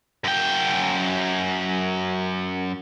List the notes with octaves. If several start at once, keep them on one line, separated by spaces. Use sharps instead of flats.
F#2 G5